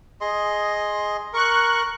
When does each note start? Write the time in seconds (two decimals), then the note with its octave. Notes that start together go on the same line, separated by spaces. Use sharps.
0.21 G#4 D#5 C6
1.33 A#4 C#6 F#6